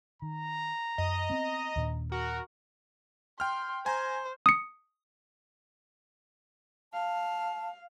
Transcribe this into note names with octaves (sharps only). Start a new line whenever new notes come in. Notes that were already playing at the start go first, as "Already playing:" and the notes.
D#3 A#5
F#2 D#5
B3 C4
D#2 A#2 D4
F#4 A#4
G5 C6 F6
C5 G#5 A#5
D#6 C#7
F5 A5